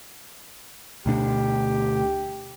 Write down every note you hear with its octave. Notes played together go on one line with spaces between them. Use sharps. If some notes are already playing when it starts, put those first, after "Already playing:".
D2 B2 D4 G4